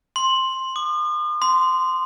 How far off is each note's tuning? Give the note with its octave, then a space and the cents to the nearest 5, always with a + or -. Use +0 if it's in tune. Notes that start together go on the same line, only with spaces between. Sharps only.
C6 +10
D#6 -45
C6 -15